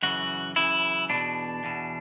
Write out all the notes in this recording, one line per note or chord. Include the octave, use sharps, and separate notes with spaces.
F#2 C#3 E3 F#4
F#2 C#3 E3 E4
E2 B2 D4
E2 B2